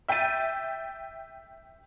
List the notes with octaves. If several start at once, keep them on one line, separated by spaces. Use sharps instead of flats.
E5 G5 G6 A6 D#7